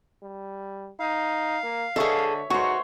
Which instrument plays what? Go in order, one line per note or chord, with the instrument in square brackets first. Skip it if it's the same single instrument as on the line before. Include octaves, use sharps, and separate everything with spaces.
[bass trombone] G3
[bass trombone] D#4 [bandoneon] F5
[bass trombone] A#3
[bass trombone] D3 [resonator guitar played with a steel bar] G#4 A4 [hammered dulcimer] C#5 E5
[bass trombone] G#2 [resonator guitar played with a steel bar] F#4 [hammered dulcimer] C5 C#5